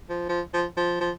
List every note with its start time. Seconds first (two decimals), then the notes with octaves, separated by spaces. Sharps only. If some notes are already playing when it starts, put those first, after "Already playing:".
0.09 F3
0.29 F3
0.54 F3
0.77 F3
1.00 F3